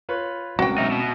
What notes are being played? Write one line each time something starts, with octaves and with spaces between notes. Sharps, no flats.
F4 B4 C#5
C2 G#3 C4 C#4 F#4 F#5 G5
B1 D#4 E5
B2